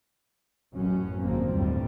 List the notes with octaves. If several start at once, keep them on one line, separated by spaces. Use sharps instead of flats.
A1 F#2 C#4
G#1 D3 D#3 A#3 C4
G1 D#2 A2 G3